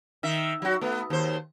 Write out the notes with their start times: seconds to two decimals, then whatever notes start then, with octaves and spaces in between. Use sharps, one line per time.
0.23 D#3 E5
0.62 F#3 F#4
0.81 A3 B3
1.10 D#2 C5